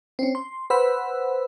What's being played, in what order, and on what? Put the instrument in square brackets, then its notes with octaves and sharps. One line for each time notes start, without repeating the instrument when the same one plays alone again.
[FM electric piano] C4 C#4
C6
B4 C5 F#5 B5 E6